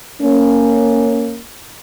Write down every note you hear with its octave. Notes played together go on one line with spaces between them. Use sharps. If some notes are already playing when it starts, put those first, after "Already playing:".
A#3 C#4